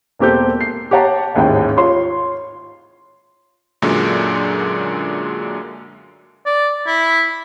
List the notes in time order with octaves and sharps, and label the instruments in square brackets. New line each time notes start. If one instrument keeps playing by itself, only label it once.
[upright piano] E1 A#3 C4 G4 A4 G6
C7
G4 C#5 F#5 A5 A#5
A1 D#2 G#2 C#4 E4 G5
F4 C#5 C6
[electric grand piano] F#2 A#2 D3 F#3 G#3
[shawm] D5
E4